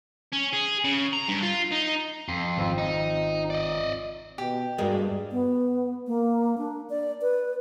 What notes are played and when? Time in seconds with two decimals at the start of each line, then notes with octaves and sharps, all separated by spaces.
0.33 C#4
0.53 G#4
0.85 C#3
1.13 A#5
1.28 G2
1.42 F4
1.71 D#4
2.28 F2 C7
2.57 G#1 C4 F4
2.78 D#4
3.50 D5 D#5
4.38 B2 G4
4.78 G2 G3 G#3 A#3 F#4 D5
5.32 B3
6.07 A#3
6.58 D4
6.90 D5
7.22 B4